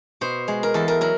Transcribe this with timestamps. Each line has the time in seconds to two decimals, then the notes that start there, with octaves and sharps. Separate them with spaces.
0.21 B2 C5
0.48 G#3
0.63 A#4
0.74 E2 A4
0.88 A#4
1.01 F#3 A#4